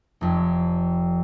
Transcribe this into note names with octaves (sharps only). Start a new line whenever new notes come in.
F1 F2